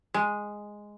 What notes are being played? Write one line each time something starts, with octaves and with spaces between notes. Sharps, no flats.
G#3